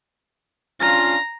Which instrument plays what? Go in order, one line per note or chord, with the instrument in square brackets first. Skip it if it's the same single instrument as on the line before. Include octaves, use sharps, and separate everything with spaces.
[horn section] C#4 D4 F4 [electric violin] A#5